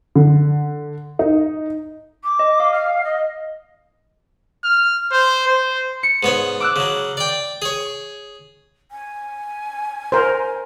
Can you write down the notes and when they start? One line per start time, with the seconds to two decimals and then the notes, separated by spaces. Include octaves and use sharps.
0.16 D3
1.19 D#4
2.23 D6
2.39 D#5
2.58 F5 D#6
2.73 F5 F6
3.04 D#5
4.64 F6
5.12 C5
5.48 C5
6.03 C#7
6.23 G#2 B3 C#5
6.60 D6 E6 F#6
6.76 C#3 F#3
7.17 D5 G5
7.62 G#4 C#5
8.91 G#5
10.12 A#4 C5